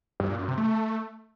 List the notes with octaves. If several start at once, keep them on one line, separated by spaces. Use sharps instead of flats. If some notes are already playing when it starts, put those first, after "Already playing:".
G2
A#2
F#2
C3
A3